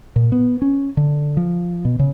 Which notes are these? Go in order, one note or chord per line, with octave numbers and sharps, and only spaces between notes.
A#2
B3
C#4
D3
F3
B2
C#3